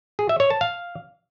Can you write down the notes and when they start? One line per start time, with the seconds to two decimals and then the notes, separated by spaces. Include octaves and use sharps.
0.19 G#4
0.29 E5
0.40 C#5
0.50 A5
0.61 F5